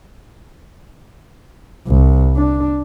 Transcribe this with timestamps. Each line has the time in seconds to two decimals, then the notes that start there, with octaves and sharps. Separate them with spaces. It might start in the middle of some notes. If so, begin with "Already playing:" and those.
1.87 C2
2.36 D4